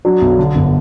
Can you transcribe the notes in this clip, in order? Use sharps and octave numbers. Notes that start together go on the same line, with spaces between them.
F#3 D4
B1
D3
G1